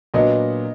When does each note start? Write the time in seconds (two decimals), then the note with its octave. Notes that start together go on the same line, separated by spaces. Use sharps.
0.14 A#2 F#3 B3 D4 D#5